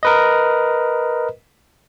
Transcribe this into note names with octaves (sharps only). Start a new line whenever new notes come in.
A#4 B4 D#5